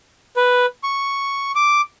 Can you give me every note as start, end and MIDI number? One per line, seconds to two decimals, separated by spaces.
0.37 0.66 71
0.84 1.52 85
1.55 1.81 86